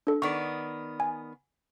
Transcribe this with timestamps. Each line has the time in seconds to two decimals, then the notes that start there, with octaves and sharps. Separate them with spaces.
0.07 D4 A4
0.22 D#3 B3 D5 C#6
1.00 G#5